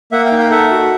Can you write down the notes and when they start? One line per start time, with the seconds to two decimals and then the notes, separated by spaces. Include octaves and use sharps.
0.12 A#3 E5 F#5
0.25 F5 G5
0.31 D#4
0.38 F5 G5
0.51 A4 E5 F#5
0.71 F#4